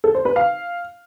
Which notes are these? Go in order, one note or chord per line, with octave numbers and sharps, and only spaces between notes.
A4
C5
B4
F5